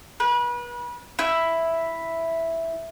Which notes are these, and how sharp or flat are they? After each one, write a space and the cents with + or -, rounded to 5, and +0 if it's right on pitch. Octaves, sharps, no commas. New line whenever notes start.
B4 -35
E4 +0